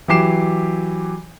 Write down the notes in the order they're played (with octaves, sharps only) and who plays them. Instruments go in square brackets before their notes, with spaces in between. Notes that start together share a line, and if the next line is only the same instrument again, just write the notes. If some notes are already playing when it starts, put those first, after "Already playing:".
[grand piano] E3 F#3 G4 D6 C7 E7